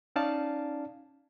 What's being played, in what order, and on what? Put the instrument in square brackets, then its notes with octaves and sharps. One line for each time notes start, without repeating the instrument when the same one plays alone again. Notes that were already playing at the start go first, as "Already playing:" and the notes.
[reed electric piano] C#4 D#4 D5 F5 A5